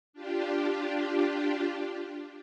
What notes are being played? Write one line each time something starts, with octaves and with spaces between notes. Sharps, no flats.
D4 F4 G4